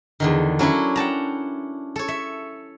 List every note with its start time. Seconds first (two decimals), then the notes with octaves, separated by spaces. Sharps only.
0.20 E2 D3 D#3
0.59 F#3 C#4 D4 E4
0.96 F#5 G5 A5 A#5
1.96 A4 C#5
2.08 E5